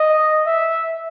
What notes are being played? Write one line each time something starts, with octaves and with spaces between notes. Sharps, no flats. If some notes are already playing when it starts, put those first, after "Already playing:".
Already playing: D#5
E5